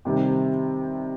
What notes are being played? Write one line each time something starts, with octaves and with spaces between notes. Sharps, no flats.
C3 D#3 G3 C4 G4